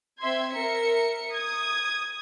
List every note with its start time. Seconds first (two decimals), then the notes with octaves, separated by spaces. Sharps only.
0.22 C4 E5 C6 G#6
0.54 A#4 E5 C#7
1.33 D#6 G#6